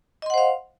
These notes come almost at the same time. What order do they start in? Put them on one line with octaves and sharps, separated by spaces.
D#5 C6 F#5 C5 F5